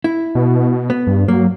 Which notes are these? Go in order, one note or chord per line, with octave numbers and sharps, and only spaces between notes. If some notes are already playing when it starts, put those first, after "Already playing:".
E4
B2
B3
G2
F#3 A#3